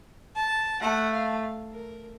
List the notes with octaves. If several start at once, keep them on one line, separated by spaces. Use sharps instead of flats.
A5
A3 F#5
F5
A#4